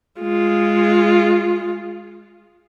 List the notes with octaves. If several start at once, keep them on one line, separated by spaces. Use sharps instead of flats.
G#3 F4